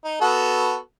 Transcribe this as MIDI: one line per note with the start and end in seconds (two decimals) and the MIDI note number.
0.04 0.21 63
0.21 0.76 59
0.21 0.76 66
0.21 0.76 69